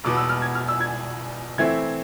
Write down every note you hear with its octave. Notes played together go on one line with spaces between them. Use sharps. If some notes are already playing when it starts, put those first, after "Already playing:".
E2 B2 B3 D6
E6
F6
G#6
F6
E6
G#6
E3 A3 C4 E4 G#6